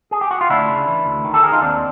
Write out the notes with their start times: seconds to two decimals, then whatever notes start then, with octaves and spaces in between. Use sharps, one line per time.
0.11 G#4
0.21 G4
0.31 F#4
0.41 F4
0.50 D2 D4 E4
0.69 C#3
0.88 E3
1.06 D2
1.25 D#3
1.34 G4 A4
1.43 D#3 G#4 A#4
1.52 D#4 F4
1.62 D#2 C4 D4